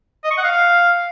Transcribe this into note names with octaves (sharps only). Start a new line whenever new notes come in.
D#5
C#6
F#5
F5